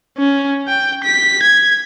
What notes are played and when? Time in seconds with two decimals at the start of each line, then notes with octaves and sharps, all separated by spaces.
0.18 C#4
0.68 G5
1.04 B6
1.43 G#6